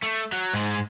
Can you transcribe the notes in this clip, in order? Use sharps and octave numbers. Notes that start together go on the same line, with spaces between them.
A3
F#3
G#2 G#3